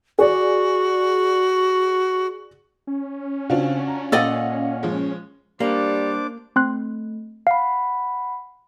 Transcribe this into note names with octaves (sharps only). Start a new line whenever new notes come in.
F#4 G#4 D5
C#4
C#3 C4 D4 F4 F#4
A#5
A#2 A4 D5 D#5 F5 F#5
F3 G#3
G3 A#3 D4 C5 D5 D6
A3 C4 C6 F#6
F5 F#5 B5